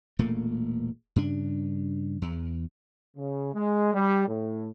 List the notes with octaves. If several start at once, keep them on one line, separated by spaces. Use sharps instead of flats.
E1 A#2 A3 A#3
G2 C#3 D4
E2
C#3
G#3
G3
A2